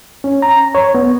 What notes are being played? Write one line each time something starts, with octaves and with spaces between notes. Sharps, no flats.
C#4
A#5
C#5
B3